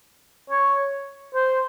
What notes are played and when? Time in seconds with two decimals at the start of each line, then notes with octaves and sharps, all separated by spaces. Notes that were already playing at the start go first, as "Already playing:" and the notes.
0.50 C#5
1.35 C5